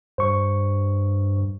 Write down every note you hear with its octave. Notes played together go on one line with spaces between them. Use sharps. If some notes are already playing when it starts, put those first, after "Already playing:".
G2 C5 C#6